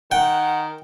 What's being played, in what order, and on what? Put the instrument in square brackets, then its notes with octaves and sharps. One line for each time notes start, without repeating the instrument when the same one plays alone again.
[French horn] D#3 [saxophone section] F#5 [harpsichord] G5